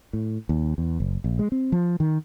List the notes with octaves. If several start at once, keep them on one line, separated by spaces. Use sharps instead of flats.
A2
D#2
E2
F#1
A#1
G#3
C4
F3
D#3